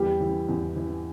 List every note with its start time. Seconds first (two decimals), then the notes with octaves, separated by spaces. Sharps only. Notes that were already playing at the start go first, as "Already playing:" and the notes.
Already playing: E2 G3 G4
0.20 E3
0.48 E2
0.76 E3